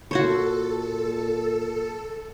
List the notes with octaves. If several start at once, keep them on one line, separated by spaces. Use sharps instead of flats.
A#2 F#4 A4 C5 C#5